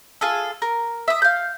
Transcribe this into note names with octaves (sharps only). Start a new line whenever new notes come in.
F4 G#4 A4
A#4
E5 D#6
F5 G6